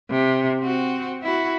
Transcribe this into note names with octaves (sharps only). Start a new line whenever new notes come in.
C3
C4 F#4
E4 F#4